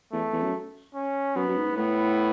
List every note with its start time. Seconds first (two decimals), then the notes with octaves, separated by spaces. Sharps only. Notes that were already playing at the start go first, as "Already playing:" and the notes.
0.12 E2 A3
0.33 E2
0.43 F#2
0.95 C#4
1.36 F#2 B3
1.48 F#2
1.56 G#2
1.71 G#2
1.76 A2 B3